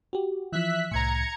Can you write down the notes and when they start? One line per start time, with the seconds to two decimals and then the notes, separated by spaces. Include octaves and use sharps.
0.13 F#4 G4
0.52 E3 F3 E5 F#6 B6
0.91 C2 A2 A#5 G#6 C#7